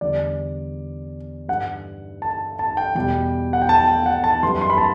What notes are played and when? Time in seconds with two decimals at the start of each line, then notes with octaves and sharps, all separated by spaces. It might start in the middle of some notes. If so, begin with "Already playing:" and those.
0.01 E2 D3 G3 D5
1.48 G2 E3 G3 F#5
2.22 A5
2.59 A5
2.77 G5
2.95 E2 B2 G3 G5
3.53 F#5
3.62 G5
3.69 A5
3.88 G5
4.06 F#5
4.24 A5
4.43 F#2 E3 G3 C6
4.61 C6
4.70 B5
4.78 A5